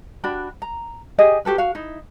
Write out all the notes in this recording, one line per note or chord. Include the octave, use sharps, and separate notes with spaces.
D4 F#4 G5 B5
A#5
G4 G#4 D#5
F#4 G4 A4 B4
F#4 F5
D#4 E4